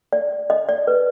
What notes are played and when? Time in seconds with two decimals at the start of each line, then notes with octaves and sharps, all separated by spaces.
0.13 D5
0.50 D#5
0.69 D5
0.87 B4